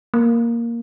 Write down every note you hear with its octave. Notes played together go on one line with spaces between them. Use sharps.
A#3